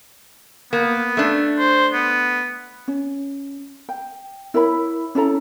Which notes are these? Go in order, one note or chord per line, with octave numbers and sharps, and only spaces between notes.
A#3 B3
A3 D4
C5
B3
C#4
G5
E4 A#4 C#5 B5
C#4 E4 A4 A#5